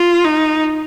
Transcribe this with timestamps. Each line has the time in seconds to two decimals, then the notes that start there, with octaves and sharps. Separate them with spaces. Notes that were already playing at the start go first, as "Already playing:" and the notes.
Already playing: F4
0.24 D#4